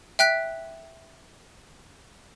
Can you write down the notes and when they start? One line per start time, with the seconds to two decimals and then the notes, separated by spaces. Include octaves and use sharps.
0.19 E5 G5 F#6 B6